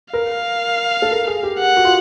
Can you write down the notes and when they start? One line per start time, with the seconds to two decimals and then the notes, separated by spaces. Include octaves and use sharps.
0.13 A#4 F5
1.02 A4
1.11 A#4
1.27 G#4
1.43 G4
1.60 F#5
1.77 F#4
1.85 F4